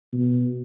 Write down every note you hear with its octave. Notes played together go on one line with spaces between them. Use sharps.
B2